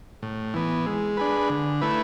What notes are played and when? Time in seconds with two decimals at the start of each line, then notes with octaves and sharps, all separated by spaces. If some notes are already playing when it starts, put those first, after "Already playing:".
0.23 A2
0.54 E3 B3
0.86 G#3
1.17 D4 G#4 B4
1.50 D3
1.82 A3 E4 B4